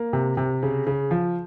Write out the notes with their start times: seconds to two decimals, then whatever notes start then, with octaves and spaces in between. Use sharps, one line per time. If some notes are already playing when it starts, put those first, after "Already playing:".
Already playing: A#3
0.13 C3
0.37 C3
0.63 C#3
0.87 C#3
1.11 F3